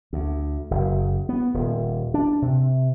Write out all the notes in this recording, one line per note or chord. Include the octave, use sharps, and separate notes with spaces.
D2
F#1
B3
D#1
D4
C3